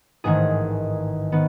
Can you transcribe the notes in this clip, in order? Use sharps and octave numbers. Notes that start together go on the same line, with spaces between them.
A1 G#2 D#3 G#4
D#3 B3